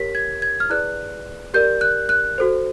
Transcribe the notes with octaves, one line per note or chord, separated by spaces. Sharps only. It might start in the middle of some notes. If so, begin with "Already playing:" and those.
Already playing: G4 A#4 C#5 B6
G#6
G#6
F6
E4 G#4 B4 D5 F#6
G4 A#4 D5 G6
F#6
F#6
F#4 A4 C5